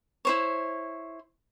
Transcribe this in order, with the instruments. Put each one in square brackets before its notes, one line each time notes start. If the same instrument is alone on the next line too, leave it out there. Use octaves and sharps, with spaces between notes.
[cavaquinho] E4 C5 C#5